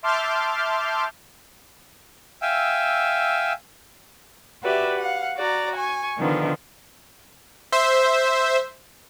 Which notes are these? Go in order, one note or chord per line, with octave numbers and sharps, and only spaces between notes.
E5 A5 C6 D6 F6 G6
E5 F5 G5 G#5 E6
F#4 G4 B4 D5 E5
F5 F#5
F#4 D5 A#5
G#5 C#6
D3 D#3 F3 B3 D#4
C5 E5